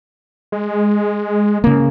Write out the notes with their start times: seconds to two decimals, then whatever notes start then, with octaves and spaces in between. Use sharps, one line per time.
0.52 G#3
1.64 C#3 A#3